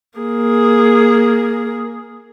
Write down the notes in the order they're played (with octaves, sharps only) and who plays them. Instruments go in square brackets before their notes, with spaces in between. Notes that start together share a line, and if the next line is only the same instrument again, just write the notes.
[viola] A#3 G#4